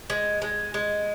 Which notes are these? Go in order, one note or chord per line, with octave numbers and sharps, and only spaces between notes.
G#3
G#3
G#3